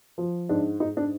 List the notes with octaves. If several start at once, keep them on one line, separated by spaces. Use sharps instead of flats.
F3
G#2 D4
G#2 D#4
D4